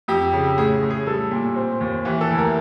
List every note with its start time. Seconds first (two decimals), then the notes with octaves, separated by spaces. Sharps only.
0.08 F2 G4
0.33 C#3
0.58 A2 G#4
0.83 A2
0.90 G#4
1.06 G3 A4
1.31 A#2
1.56 C4
1.81 D#2
2.05 E3 G4
2.21 A4
2.30 D2
2.38 A#4